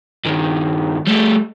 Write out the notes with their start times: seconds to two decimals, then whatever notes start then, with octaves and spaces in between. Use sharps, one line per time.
0.25 G2 D#3
1.07 G3 A3